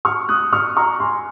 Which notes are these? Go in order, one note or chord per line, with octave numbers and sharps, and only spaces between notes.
C#6 F6
D#6 F#6
C#6 F6
A#5 C#6
G#5 C6